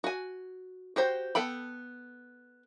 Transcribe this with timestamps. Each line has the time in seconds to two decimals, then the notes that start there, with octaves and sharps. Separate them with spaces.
0.04 F#4 G#5
0.96 F#4 G4 C5
1.35 B3 A4 G5 B5